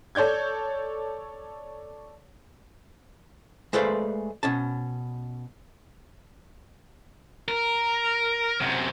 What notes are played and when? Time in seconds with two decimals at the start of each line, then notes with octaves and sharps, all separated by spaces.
0.15 A4 C#5 D5 G6 G#6
3.73 G#3 A3 B4 C5 D5 F5
4.43 B2 C#4 A5
7.48 A#4
8.60 F#2 C3